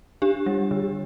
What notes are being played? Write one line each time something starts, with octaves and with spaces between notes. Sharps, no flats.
D4 G4
G3
D3